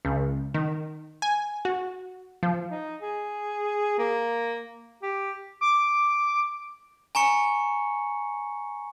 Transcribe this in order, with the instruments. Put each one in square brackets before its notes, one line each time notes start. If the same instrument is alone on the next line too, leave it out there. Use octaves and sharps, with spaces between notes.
[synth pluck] C#2
D#3
G#5
F#4
F3
[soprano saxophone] D#4
G#4
A#3
G4
[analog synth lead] D6
[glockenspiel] G#5 A#5 C#6 C#7